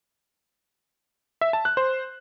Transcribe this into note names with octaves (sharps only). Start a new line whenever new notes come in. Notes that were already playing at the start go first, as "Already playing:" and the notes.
E5
A5
F#6
C5